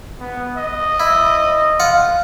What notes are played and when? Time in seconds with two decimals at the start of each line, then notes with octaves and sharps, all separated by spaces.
0.20 B3
0.58 D#5
1.00 E4
1.80 F4 F#5